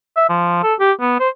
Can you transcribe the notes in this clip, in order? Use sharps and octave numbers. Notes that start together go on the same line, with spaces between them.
E5
F3
A4
G4
B3
C5